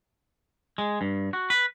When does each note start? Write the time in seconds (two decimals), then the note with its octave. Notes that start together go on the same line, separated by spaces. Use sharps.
0.78 G#3
1.01 G2
1.33 F#4
1.50 B4